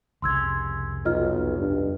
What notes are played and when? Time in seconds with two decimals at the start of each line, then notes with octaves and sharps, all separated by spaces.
0.22 F1 C2 C#3 C6 E6 G#6
1.06 B1 F4 D#5 F6
1.58 G2